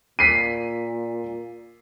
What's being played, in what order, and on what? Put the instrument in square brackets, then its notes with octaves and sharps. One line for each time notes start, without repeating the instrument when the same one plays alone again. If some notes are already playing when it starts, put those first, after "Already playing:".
[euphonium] A#2 [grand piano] B6 C7 D#7